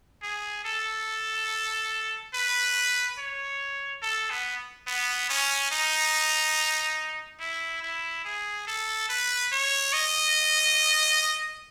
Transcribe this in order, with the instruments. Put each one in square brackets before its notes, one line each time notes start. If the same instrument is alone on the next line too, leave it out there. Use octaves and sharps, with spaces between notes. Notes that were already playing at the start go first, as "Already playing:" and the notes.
[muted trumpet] G#4
A4
B4
C#5
A4
B3
B3
C#4
D#4
E4
E4
G#4
A4
B4
C#5
D#5